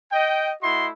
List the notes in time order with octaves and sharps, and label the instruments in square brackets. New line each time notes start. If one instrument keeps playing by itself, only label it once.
[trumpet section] D#5 G5
A3 E4 F#4 D#5 C6